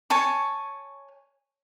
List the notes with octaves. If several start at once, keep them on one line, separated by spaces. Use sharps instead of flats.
C#5 G#5 A5 C#6